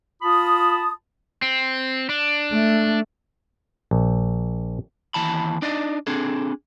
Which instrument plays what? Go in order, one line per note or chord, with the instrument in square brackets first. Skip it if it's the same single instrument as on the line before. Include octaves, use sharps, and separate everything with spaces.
[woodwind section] F4 A5 B5 D#6
[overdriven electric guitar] C4
D4
[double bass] A3
[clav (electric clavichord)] A#1
[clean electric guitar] D#2 E3 A5 B5
D4 D#4 D5 D#5
C4 D4 G#4 A4